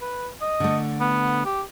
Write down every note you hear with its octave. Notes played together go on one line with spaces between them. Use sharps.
B4
D#5
D3 A3
B3
G4